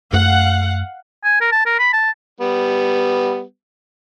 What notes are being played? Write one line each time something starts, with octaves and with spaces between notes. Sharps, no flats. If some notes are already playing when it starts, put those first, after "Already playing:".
F#2 A3 F5 F#5
G#5
A#4
A5
A#4
B5
A5
G3 B3